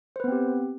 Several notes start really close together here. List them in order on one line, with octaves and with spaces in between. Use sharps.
C5 B4 B3 C4 G4